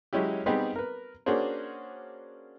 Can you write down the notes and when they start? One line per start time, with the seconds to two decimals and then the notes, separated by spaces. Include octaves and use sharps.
0.13 F#3 G#3 C#4 E4 G4
0.46 G3 B3 C4 D#4 G4 G#4
0.76 A#4 B4
1.26 A#3 C#4 D4 F#4 G#4 C5